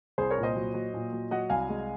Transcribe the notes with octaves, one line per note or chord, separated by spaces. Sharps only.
C2 G#4 C5
A#4 C#5
A#2
C5 D#5
F#3
F#3
A#2
F#3
F#3 D#5 F#5
C2 F5 G#5
G#3